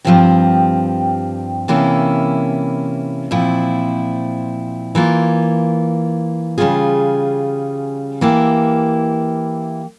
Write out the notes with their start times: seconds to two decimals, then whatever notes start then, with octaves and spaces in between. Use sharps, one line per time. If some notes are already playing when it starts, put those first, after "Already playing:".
0.05 G2 F3 C4 G4
1.68 C3 E3 A#3 C#4 E4
3.31 A#2 F3 C4 E4
4.95 E3 A#3 F4
6.58 C#3 G3 C#4 F4 G#4
8.21 E3 A#3 E4 G4